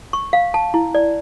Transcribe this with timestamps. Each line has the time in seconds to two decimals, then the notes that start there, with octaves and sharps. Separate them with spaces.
0.13 C#6
0.33 F5
0.54 A5
0.74 E4
0.95 D5